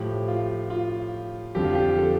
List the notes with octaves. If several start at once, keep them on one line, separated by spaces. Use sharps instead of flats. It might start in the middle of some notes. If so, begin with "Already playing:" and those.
Already playing: A2 F3 G4
F4
F4
F2 D3 F3 G4
F4
G4
A4